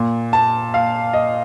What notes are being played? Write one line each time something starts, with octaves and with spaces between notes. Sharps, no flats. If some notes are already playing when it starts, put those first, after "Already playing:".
Already playing: A#2
A5
F5
D#5